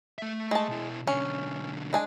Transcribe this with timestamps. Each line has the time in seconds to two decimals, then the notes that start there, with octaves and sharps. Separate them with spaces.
0.18 A3 E5
0.51 G#3 A5
0.68 B2 E4
1.07 B1 D3 C#4
1.93 G#3 D4 G#5